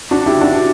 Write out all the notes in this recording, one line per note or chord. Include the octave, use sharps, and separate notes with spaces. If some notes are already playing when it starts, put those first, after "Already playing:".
D4 F#4
E4 G4
D4 F#4